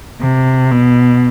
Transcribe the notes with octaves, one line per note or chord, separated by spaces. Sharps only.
C3
B2